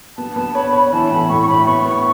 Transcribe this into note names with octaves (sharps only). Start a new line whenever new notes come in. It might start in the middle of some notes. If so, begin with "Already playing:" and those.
B3 A5
B3 A5
C#5 B5
C#5 B5
E3 A5
A2 B5
A2 C#6
C#6
A2 B5
B3 C#6
B3 C#6